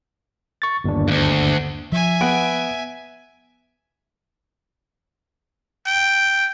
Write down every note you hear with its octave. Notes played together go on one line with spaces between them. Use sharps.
C#6 A6
G1 D#2 D4
D2 G2
F3 E5 G#5
B3 F#5 D7
G5